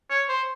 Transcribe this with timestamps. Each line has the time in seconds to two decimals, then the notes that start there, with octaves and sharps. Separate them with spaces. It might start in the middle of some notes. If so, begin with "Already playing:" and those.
0.10 C#5
0.28 C5